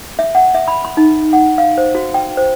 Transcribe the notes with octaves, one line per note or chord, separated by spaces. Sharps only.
E5
F#5
E5
B5
C6
D#4
F#5
F5
C5
F#4
G5
C5